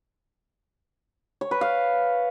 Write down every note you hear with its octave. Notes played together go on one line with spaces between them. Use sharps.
C#5
B4
F5